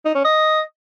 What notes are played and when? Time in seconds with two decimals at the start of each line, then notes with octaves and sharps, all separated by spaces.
0.05 D#4
0.15 C#4
0.25 D#5